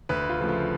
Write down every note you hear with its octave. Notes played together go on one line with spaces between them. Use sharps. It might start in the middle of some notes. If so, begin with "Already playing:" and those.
D2 B4
F4
C#3 F3 A3
F4